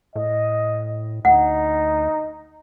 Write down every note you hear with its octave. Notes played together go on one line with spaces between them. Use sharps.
A2 D#5
D2 D#4 F#5